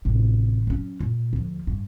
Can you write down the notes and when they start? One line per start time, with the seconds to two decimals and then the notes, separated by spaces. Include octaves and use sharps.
0.05 A1 C3
0.67 F#3 C#4
1.00 A#2
1.33 D2 F3
1.67 G2